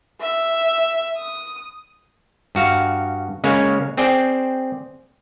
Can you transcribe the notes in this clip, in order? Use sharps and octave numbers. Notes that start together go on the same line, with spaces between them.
E5
D#6
G2 F#4 F5
C#3 G#3 A#3 C#4
C4 G#4 D5 G5